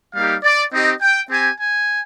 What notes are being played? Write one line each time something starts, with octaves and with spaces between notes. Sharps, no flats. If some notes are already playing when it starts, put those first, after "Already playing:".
G3 A#3 D#4 G4 F5
D5
C4 D#4 G4 D#5
G5
C4 G4 G#5
G#5